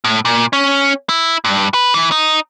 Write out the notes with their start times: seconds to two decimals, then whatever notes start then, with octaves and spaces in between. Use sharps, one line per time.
0.04 A2
0.25 A#2
0.53 C#4
1.09 E4
1.45 G2
1.74 B4
1.94 E3
2.12 D#4